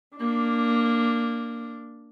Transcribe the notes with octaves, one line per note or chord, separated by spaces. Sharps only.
A#3 D4